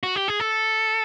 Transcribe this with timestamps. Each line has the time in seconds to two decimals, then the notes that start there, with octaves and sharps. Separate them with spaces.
0.03 F#4
0.16 G4
0.28 G#4
0.40 A4